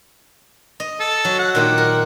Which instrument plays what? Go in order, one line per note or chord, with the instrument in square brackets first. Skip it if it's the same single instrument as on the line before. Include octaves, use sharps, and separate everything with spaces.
[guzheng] D#5
[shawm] A4
[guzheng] F#3
[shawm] F#5
[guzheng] A#2 D#3 G4
A#4